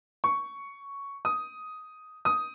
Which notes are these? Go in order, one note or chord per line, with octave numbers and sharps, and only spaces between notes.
C#6
D#6
D#6